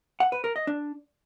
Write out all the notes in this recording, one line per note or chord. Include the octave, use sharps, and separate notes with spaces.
F#5
B4
A#4
D#5
D4